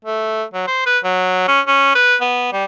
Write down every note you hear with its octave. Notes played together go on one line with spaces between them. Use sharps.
A3
F#3
C5
B4
F#3
C#4
C#4
B4
B3
G3